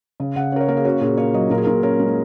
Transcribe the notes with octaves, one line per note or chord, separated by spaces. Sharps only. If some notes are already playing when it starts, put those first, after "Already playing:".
C#3
C#3 F#5
C#4 A#4
C#5
A#3 A#4
G#4
C#4 F#4
A#2 G#4
A#3 C#5
F#3 D#5
A#2 A#4
G#4
A#2 A#4
C#4 A#4
G#3